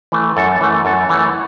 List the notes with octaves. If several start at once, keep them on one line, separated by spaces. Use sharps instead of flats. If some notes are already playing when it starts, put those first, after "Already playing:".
E3 A3
F#2 A4
E3 A3
F#2 A4
E3 A3 C#5